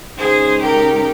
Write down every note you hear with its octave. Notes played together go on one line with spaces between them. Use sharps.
C#3 G#3 D#4 G#4 C5
G4 A#4